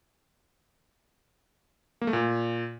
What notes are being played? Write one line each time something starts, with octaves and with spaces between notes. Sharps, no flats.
A#3
A3
A#2